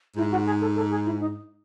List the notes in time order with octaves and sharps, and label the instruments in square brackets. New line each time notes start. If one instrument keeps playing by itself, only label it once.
[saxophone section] G#2 [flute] E4
[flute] F#4
G#4
A4
A4
G#4
E4
D#4